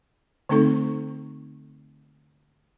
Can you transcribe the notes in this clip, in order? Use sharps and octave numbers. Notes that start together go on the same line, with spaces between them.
D3 A3 C4 D#4 A4 C#6